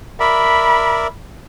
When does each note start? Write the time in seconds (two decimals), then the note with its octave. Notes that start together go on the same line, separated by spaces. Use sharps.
0.20 A#4 D5 E5 B5